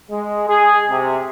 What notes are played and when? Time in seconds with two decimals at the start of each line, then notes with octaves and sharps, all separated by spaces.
0.11 G#3
0.48 G#4
0.89 C3